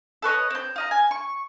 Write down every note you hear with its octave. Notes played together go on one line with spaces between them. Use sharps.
A4 B4 C#5 D#5
C4 G6
F4 D#5 A#5
G#5
C#6